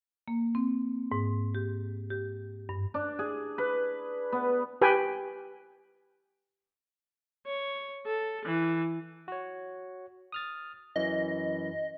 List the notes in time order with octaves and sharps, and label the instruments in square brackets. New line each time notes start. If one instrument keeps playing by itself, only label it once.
[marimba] A#3
C4
G#2
G4
G4
G2
[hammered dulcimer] D4
G#4
B4
B3
[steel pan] G4 B4 G5 G#5
[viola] C#5
A4
E3
[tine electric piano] F#4 C#5
D#6 F6 A6
[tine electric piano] F#2 E3 C#4 [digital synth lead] D#5